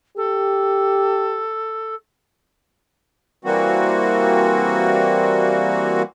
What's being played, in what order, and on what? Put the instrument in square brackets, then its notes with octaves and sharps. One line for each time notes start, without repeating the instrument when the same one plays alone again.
[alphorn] G4 [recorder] A4
[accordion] E3 G3 A#3 C4 F#4